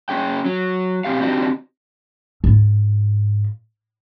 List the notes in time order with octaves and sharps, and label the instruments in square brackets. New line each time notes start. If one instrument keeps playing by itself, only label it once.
[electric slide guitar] C#4 G#4 G5
F#3
B2 G3 C4 G4 F5
C4 D4 D#4 F#4 G4
[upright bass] G#2 F4